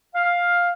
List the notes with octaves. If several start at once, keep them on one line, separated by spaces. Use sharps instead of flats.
F5